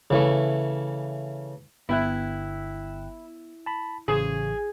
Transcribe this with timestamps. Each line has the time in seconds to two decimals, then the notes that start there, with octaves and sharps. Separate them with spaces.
0.10 C#3 E3 A3
1.89 G1 B3 E4 E5 G5 F#6
3.66 A5 B5
4.08 A1 C#3 G#4 C5